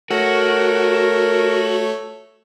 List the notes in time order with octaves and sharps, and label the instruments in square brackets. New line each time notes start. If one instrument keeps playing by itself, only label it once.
[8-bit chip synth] A3 A4 C#5 [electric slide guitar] F#4 [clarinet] A#4